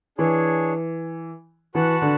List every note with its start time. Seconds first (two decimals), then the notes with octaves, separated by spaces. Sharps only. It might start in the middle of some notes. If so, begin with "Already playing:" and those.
0.18 E3 D4 G#4 C#5
1.75 E3 F#4 B4 F#5 A5
2.02 D3